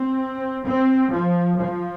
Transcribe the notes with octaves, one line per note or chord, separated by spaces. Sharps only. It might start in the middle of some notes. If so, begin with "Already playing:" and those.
Already playing: C4
C4
F3
F3